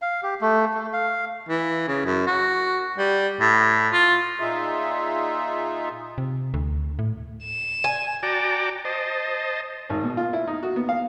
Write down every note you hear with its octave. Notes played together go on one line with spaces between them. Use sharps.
F5
G4
A3
A3
F5
E3
C#3
F#2
F#4
G3
A2
F4
A#2 D#4 F4 G#4 E5
C3
D2
A2
E7
G#5
F#4 D5 G5 A5 A#5 D6
C5 D#5 A5
G#1
B2
F4
E4
D#4
F#4
B3
F5